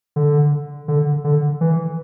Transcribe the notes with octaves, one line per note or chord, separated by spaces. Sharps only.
D3
D3
D3
E3